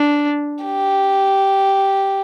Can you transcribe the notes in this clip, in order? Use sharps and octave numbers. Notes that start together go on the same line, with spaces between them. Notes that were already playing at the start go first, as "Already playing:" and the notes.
Already playing: D4
G4